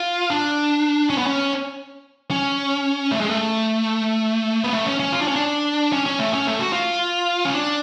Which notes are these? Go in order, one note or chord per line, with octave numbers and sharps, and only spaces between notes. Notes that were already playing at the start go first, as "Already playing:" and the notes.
Already playing: F4
D4
C#4
B3
C#4
C#4
A3
G#3
A3
B3
A3
C#4
C#4
F4
D4
C#4
D4
C#4
C#4
A3
C#4
A3
F#4
F4
C#4
D4